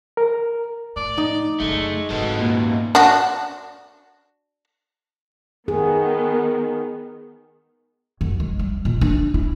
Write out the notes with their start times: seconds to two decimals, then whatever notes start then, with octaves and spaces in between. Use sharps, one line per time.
0.17 A#4
0.96 A2 D5
1.17 D#4
1.60 F#2 C#3 G#3 A3
2.10 G#2 B2 D#3 A4 D#5
2.38 D#2 A#2
2.95 D4 F#4
5.68 D#3 B3 G#4
8.21 F#2
8.40 G#3
8.59 G3
8.85 A#2
9.01 D4
9.34 E4